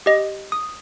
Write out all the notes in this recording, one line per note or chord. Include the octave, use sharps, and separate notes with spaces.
G4 D#5
D#6